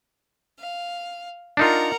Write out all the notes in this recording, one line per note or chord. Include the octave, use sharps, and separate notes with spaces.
F5
D4 D#4 F4 A#4 F#5 A#5